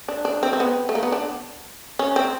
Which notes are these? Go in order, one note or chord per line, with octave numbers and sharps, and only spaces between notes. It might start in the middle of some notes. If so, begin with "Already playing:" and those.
D4
D4
C4
C4
B3
A3
A#3
B3
D4
C#4
C4